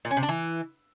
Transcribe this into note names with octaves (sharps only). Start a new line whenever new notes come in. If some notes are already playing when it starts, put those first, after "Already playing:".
A#2
C#4
C3
D4
E3